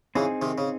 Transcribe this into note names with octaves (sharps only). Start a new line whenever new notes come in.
C#3 E3 C4 D#4 G#4
C3 D#3
C#3